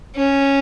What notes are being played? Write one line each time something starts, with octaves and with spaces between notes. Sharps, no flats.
C#4